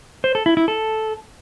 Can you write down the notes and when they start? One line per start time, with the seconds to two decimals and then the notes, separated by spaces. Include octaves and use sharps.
0.24 C5
0.35 A4
0.46 E4
0.57 E4
0.68 A4